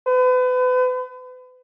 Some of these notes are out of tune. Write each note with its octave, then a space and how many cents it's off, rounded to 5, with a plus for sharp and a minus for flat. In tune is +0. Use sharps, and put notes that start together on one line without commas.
B4 +35